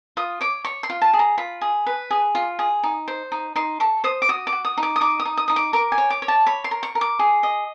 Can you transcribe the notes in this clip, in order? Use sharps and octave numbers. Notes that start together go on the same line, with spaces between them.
F4 D#6
C#5 D6
C#5 C#6
C6
F4
A5
G#4
A#5
F4 B5
G#4
B4
G#4
F4
G#4
D#4
C5
D#4
D#4 C6
A4 C#6
C5 D#6
D6
F#4 D#6
D6
F#4
D#6
D#4
D6
D#6
D#4 D6
D#6
D#4
D#6
D#4 D#6
D6
A#4 D6
G#5
C#5
D6
C#5
A5
C#5 B5
C6
A#4
C#6
A#4
D6
G#4
D#5